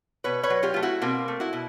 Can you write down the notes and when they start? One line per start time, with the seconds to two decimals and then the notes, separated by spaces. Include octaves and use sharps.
0.24 B2 B4 C#5
0.43 B4 C#5
0.50 F#3
0.63 F4 G4
0.74 A3 F4
0.83 E4 F#4
1.02 B2 A#3 C4
1.28 A3
1.40 E4 F#4
1.53 B2